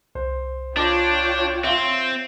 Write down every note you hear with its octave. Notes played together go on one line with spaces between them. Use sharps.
C2 C5
D4 F4 C#5 G5 A5 D6 A#6
C4 E5 F5 C6